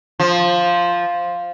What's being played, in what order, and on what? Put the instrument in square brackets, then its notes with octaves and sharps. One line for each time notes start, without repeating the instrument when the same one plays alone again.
[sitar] F3